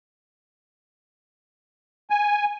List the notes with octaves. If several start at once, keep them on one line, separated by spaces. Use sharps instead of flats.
G#5